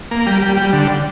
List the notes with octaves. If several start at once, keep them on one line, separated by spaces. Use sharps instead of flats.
A#3
G3
G3
G3
D3